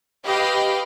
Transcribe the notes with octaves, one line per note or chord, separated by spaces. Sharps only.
G4 B4 D#5 F5 G5